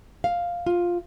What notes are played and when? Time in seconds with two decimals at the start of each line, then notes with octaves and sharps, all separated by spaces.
0.24 F5
0.66 F4